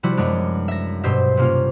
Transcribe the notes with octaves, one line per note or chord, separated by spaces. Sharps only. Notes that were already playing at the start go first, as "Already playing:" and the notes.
C3 F3 G3 E4 F#4
F#2 G#3 B3 D4
E5 A#6
G2 B2 G4 C5 E5
C3 A#3 C#4 F4